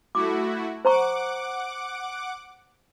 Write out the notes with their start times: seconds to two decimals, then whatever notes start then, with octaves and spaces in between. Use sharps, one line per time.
0.15 A3 E4 F#4 D6
0.85 C5 F#5 A#5 C#6 D6